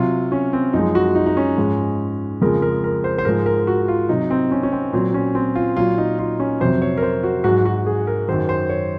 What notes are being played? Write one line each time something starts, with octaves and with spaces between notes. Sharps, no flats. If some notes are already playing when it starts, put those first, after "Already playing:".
Already playing: C3 F#3 F4
C#4
C4
F#2 F3 G#3 D#4
F#4
D#4
D#4
C#4
G#2 F3 G#3
F2 C#3 F3 G#3 A#4
A#4
A#4
C5
C5
G#2 F3 G#3 A#4
A#4
F#4
F4
C3 F#3 D#4
C4
C#4
C#4
C4
A#2 F#3 C4
C#4
C4
F4
A#2 F#3 F4
D#4
F4
C#4
F2 C3 F#3 C5
C#5
A#4
C5
F#4
G#2 F#3 F#4
F#4
G#4
A#4
F#2 D#3 F#3 C5
C5
C#5